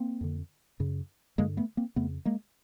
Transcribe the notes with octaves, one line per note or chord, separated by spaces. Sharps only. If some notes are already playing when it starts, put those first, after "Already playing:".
Already playing: A#3 C4
F2 D3
F#2 C#3
G2 D3 G#3 A#3
A3 B3
A#3 C4
F2 C#3 A3 B3
G#3 A#3